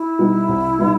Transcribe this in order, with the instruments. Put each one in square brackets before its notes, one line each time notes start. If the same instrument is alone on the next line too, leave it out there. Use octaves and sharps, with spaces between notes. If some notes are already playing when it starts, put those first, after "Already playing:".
Already playing: [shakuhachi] E4
[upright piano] B2 G3 B3 D#4
C2
B2 G3 B3 D#4